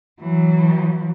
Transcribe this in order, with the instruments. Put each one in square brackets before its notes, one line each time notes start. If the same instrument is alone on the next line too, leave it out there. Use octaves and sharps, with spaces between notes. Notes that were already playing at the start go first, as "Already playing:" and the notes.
[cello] E3 F#3